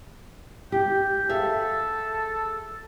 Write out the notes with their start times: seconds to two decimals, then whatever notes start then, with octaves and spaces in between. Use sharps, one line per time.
0.72 G4 G5
1.29 G#4 A4 E5 F5